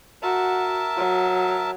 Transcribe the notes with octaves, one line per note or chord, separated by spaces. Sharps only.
F#4 A#4 E5 A5
F#3